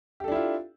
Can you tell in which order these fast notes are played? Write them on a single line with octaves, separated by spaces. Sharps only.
G4 A4 D4 E4 F4